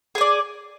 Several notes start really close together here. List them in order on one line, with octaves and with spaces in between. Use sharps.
G#4 G#5 D5